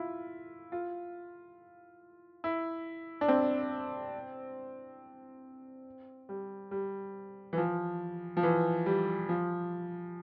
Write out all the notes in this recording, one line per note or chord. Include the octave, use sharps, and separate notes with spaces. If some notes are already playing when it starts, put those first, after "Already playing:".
Already playing: E4 F4
F4
E4
D4
C4
G3
G3
E3
F3
F3
E3
G3
F3